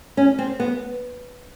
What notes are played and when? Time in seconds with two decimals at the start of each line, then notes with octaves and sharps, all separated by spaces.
0.17 C#4
0.39 C4
0.60 B3